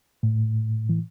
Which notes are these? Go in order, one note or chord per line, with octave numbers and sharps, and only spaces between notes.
A2
E3